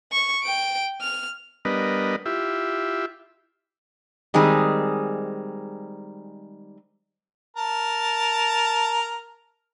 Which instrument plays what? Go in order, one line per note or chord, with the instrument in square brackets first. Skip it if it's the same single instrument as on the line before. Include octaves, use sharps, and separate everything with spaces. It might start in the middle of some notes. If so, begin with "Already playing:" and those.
[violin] C#6
G5 D7
F6
[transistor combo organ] G3 B3 D4 A#4 B4 D#5
E4 F4 G4 E5
[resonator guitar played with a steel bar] D#3 G3 G#3 C4 G#4
[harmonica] A#4 A5